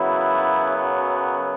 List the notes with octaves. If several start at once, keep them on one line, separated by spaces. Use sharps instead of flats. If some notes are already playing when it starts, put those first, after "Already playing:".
Already playing: F#2 C#3 F#3 B3 E4